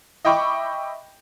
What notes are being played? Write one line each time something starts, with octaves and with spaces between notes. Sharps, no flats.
D#5 E5 G5 B5 C#6 D6